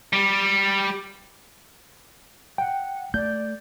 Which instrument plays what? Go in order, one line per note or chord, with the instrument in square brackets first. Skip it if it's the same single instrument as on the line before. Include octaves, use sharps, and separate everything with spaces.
[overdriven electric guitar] G3
[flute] F#5 [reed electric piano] G5
[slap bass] A3 [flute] D5 [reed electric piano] G6